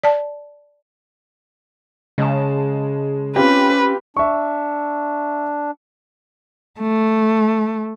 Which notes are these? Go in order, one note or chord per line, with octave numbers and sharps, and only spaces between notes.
D5 A5
C#3 G#3 A5
C4 C#4 F4 G4 B4
D4 E5 C#6
A3